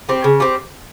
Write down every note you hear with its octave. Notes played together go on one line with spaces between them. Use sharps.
G3 C4
C#3
G3 C4